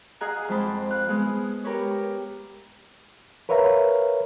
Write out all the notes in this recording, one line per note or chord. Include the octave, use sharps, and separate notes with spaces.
G#4 D#5 F5 F#5 G#5 A#5
F2 G#3 C5 A5 B5
F5 F#6
G#3 B3 G#4
G4 A#4 B4 C#5
A#4 B4 C#5 E5 F5 A#5